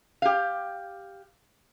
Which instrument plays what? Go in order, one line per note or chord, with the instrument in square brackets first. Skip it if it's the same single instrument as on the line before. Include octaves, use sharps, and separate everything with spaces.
[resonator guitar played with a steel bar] G4 F5